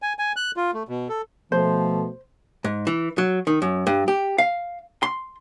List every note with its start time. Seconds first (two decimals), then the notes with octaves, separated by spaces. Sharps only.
0.02 G#5
0.19 G#5
0.36 F#6
0.57 F4
0.74 A3
0.89 B2
1.09 A4
1.52 B2 F3 A3 C5
2.64 G#2
2.87 E3
3.18 F#3
3.47 D#3
3.62 F#2
3.87 G2
4.08 G4
4.38 F5
5.03 C6